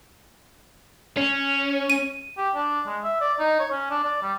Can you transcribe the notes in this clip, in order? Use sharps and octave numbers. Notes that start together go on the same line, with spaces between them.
C#4
D#7
G4
D4
G#3
E5
D5
D#4
C#5
C#4
D4
D5
G3